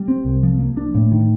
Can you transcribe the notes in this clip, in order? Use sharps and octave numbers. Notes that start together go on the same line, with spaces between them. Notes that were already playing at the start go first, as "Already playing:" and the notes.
Already playing: G3
C4
C2
F3
A#3
D4
A2
D#3